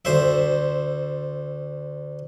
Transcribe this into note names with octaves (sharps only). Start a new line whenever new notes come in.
D2 C5 E5